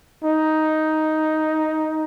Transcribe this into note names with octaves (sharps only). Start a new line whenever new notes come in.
D#4